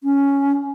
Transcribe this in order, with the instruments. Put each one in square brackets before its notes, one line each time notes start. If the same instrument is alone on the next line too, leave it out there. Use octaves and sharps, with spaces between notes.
[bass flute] C#4